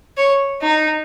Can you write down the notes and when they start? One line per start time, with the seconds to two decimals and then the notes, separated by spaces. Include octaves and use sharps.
0.17 C#5
0.61 D#4